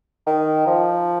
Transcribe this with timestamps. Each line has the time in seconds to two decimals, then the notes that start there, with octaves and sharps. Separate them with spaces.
0.26 D#3
0.66 F3